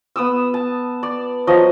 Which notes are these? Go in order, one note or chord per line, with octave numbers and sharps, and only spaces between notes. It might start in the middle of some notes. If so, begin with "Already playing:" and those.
B3 D#6 E6
A5
D5
F3 F#3 D#5